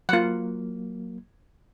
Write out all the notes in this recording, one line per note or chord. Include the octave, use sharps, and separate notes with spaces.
F#3 A#3 F4 F#5